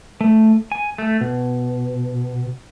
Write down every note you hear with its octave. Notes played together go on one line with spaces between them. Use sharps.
A3
G#5
A3
B2